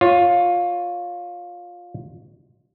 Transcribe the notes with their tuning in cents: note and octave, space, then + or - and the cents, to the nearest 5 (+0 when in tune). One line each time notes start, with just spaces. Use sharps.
F4 +15 C#5 +0